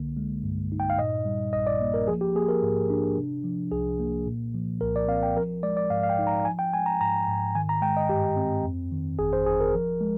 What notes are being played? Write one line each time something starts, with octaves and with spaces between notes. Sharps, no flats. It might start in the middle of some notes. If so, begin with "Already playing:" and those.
Already playing: C2 D3 A#3
G#3
G2
D#4
G5
F5
A#2 D#5
G3
A#1 D#5
D5
A#3
A#4
F3 G#4
G4
A#3 G#4
A#4
G#2
D4
C3
F3
C2 G#4
A#3
A#2
F3
C2 A#4
D5
C4 F5
G5
F3 A#4
G#3 D5
D5
G#2 F5
F5
G5
D#4
A#5
F3 G#5
G5
G#3 G#5
A#5
G#2 A#5
G#2
D#3 G#5
A#5
G#3 G5
D#5
G2 G4
C4
F2
D#3
G1 G#4
C5
G1 G#4
A#4
F3
G#3